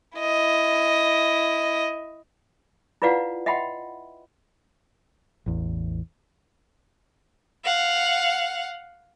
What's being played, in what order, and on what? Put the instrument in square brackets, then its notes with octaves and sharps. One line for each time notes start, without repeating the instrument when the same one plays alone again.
[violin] E4 D#5
[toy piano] E4 F4 B4 D5 F5 F#5
D#5 E5 F#5 G5 B5 C6
[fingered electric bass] A1 E2
[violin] F5 F#5